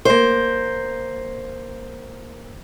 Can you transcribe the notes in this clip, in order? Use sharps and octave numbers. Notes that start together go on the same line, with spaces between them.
A#3 C5